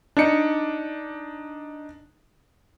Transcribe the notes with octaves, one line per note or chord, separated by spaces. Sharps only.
D4 D#4 C#7